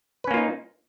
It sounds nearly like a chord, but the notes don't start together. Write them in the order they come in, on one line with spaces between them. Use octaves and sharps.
B4 C#4 A#3 F4 D#4